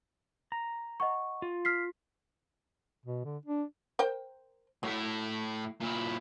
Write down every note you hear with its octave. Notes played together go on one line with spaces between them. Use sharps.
A#5
D#5 F#5 C#6
F4
F6 B6 C7
B2
D3
D4
A#4 C5 G5
A2 F#3 E4
A#2 E4